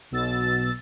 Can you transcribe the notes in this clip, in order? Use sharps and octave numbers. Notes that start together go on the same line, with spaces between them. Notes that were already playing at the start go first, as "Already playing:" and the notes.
B1 B2 E6 A6